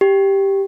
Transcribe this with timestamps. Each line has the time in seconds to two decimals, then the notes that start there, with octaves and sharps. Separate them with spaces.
0.01 G4